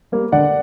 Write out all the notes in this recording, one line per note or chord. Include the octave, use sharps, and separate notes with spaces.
G3 A#3
D3 D5 F#5